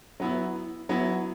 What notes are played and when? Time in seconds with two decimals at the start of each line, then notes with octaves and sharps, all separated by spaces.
0.20 F#3 B3 E4
0.89 F#3 B3 E4